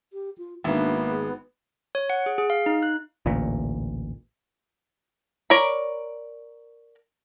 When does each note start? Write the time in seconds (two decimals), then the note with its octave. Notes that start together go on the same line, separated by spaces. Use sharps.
0.13 G4
0.38 F4
0.64 G#1 A#3 B3 D4 E5
1.09 G#4
1.95 C#5
2.10 F#5
2.26 G#4
2.38 G#4
2.50 F5
2.66 D#4
2.83 F#6
3.26 A1 D2 A#2
5.50 A#4 C#5 D5 B5